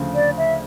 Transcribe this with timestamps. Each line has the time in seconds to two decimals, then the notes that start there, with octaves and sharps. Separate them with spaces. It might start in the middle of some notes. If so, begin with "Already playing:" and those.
Already playing: D2 C#3 F3
0.15 D5
0.37 E5